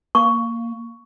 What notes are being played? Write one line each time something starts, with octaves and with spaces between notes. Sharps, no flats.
A#3 C#6